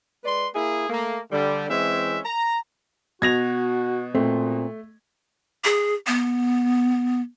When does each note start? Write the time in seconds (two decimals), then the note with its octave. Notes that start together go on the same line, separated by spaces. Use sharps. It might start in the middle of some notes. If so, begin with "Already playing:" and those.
0.24 G#3 B4 D5 C6
0.54 A#3 E4 G#4
0.89 A3 A#3
1.31 D3 G3
1.69 E3 G#3 C4 C#4 E5
2.24 A#5
3.22 B2 F#4 G#6 A#6 F7
4.15 A#2 A3 C4
5.64 G#4
6.07 B3